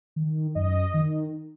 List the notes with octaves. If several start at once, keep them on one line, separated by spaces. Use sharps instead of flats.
D#3
F#2 D#5
D#3